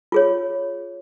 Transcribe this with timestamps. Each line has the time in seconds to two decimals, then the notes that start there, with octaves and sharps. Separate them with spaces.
0.12 F4 G#4 C#5